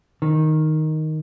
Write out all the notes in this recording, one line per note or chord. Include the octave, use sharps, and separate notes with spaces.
D#3